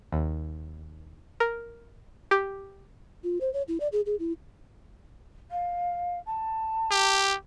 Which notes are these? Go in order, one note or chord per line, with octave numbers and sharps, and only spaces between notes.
D#2
A#4
G4
F4
C5
C#5
E4
D5
G#4
G#4
E4
F5
A5
G4